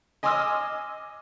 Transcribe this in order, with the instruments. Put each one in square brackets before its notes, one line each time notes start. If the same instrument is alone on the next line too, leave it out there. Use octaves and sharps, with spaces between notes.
[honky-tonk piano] D#5 G#5 C6 D6 E6 F6